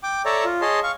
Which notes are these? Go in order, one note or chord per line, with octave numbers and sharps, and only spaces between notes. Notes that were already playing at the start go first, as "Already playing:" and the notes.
G5 D6
A4 C#5 D5 E5 A5 A#5
F4
G#4 C#5 D#5 A5 C6
F5 C#6